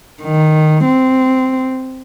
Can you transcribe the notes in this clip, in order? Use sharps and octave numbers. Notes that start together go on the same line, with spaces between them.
D#3
C4